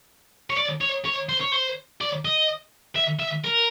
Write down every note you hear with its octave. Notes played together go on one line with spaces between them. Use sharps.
C#5
D5
C#5
C#5
C5
C#5
C5
D5
D#5
E5
E5
A#4